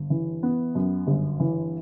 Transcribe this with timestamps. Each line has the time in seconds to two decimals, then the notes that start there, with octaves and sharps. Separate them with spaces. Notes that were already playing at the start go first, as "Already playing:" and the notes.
Already playing: G1
0.10 E3
0.43 B3
0.75 F#2
1.07 G1
1.40 E3